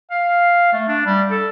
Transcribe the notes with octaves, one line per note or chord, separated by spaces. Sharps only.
F5
A3
D4
G3
A4